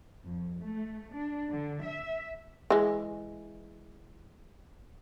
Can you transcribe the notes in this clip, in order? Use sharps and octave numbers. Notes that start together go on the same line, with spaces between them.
F2
A3
D4
D3
E5
E3 G#3